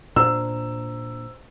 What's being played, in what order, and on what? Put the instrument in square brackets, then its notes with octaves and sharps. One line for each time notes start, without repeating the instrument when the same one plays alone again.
[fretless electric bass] A#2 D4 [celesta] C5 A#5 [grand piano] E6